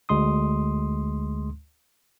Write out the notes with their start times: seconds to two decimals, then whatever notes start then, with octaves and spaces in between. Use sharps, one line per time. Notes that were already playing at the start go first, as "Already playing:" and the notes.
0.09 D2 G#3 C6 D#6